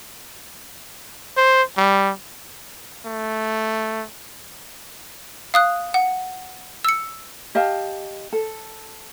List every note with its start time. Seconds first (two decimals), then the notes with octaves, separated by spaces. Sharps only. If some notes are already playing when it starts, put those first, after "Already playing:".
1.37 C5
1.77 G3
3.06 A3
5.54 F5 D#6 F#6
5.94 F#5
6.85 E6 C#7
7.55 G4 D#5 F5 A5
8.33 A4